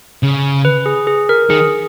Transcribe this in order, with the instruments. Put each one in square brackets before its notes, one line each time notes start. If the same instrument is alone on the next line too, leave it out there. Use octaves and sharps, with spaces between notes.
[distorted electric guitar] C#3
[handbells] B4
G#4
G#4
A#4
[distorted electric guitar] D#3 [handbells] G#4